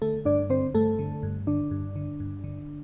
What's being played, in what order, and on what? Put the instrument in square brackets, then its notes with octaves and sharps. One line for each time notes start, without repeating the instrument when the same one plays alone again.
[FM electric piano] D3 A3 A4
G2 D4 D5
D3 C4 C5
G2 A3 A4
D3
G2
D3 D4
G2
D3
G2
D3